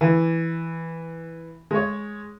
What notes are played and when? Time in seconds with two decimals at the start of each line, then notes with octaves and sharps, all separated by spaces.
0.01 E3
1.71 G#3 C#5